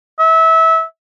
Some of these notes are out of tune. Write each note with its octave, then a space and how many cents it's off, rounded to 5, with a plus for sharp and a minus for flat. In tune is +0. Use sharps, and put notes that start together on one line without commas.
E5 -25